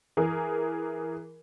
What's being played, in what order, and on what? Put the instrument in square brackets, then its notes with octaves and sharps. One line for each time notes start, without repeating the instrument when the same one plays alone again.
[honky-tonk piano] E3 G#4 A#4